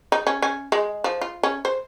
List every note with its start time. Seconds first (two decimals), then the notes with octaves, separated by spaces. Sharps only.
0.12 D#4
0.27 C#4
0.42 C#4
0.72 G#3
1.04 F3
1.21 F4
1.43 C#4
1.65 C5